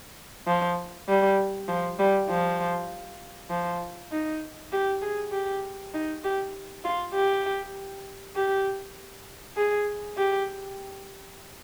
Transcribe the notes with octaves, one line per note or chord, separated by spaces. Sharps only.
F3
G3
F3
G3
F3
F3
D#4
G4
G#4
G4
D#4
G4
F4
G4
G4
G#4
G4